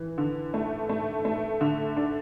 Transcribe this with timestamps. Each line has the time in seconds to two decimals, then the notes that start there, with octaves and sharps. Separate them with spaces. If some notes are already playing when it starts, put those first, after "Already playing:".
Already playing: E3
0.18 D3
0.54 A3
0.89 A3
1.25 A3
1.61 D3
1.96 D4